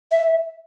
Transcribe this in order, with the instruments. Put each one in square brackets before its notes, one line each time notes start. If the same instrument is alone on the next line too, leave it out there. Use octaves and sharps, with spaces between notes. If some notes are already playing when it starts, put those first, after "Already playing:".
[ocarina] E5